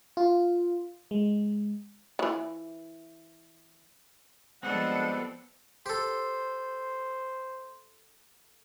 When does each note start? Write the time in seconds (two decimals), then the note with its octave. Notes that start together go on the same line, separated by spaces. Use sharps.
0.17 F4
1.11 G#3
2.19 D#3 E3
4.63 F3 G3 G#3 B3 C4 D4 A4 F#5
5.86 G4 A4 C5